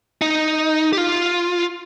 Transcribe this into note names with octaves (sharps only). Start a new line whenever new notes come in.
D#4
G4
F4